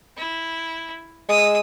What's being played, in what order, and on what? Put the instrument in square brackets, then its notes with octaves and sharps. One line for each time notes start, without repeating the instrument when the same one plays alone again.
[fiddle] E4
[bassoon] G#3 [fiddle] D#6 E6